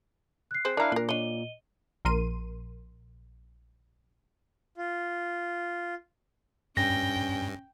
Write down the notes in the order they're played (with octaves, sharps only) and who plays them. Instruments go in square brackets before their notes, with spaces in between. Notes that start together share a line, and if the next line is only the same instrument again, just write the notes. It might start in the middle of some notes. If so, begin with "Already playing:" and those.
[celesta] F#6 C7
[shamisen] C4 G#4 C5
[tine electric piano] D4 E4 F5 [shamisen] A#4 A#5
[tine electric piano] A#2 [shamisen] D4 A#4
[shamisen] D4 C#5 [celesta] D#5 D#7 G7
[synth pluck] A#1 A#4 C6 D#7
[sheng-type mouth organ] F4
[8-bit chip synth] G2 [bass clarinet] C#4 [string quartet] G5 [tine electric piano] A#6